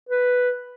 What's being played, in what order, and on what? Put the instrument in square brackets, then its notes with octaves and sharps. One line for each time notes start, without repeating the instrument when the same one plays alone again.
[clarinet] B4